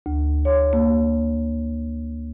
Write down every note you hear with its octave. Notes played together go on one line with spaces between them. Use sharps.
D2
C#5
A#3